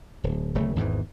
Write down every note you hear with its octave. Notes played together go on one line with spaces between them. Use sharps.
D1
D1 C#3 A3
G#1 E2 G#2 E3